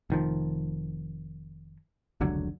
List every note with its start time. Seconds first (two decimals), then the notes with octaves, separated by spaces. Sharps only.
0.10 F1 D#3 F3
2.21 F1 C#2 D3 F#3